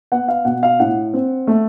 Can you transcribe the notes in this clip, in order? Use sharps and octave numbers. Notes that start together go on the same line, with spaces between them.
B3 F#5
F5
B2 F#5
F5
A2 F#5
C4
A3